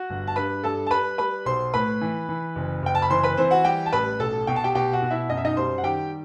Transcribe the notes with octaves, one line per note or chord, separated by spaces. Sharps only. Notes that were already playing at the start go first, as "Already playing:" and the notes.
Already playing: F#4 F#5
G1
A5
G2 B4 B5
G2 A4 A5
A5
G3 B4 B5
G3 B4 B5
B1 C5 C6
A2 B4 B5
E3
E3
F#1
F#1 G5
A5
B5
E3 C5 C6
B4 B5
E3 C4 C5
F#4 F#5
G3 G4 G5
A5
A1 B4 B5
B1 A4 A5
B2 G5
A5
G4 G5
B2 G4 G5
F#4 F#5
B2
E4 E5
F#2 D#5
E5
D#4 D#5
G3 C5 C6
F#5
D#3 G4 G5